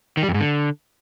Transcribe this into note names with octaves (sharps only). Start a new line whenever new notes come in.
D#3
G3
F2
G#2
D3